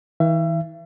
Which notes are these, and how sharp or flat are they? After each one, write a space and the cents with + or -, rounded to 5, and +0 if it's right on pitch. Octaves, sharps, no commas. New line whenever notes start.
E3 -40 E5 +40